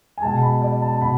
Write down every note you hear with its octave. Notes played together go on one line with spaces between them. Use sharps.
G#5
B2 G#3 A5
B5
D5
A5
B2 B5